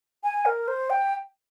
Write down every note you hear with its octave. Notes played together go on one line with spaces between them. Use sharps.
G#5
A#4
C5
G5